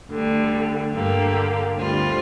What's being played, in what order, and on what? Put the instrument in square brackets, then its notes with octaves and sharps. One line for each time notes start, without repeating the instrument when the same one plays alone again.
[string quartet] D2 D3 G3
G2 D3 A#3 G4
D2 D3 G3 C4 F4